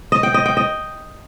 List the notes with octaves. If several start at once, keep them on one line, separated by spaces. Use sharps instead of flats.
D#5
G5
D#5
G5
D#5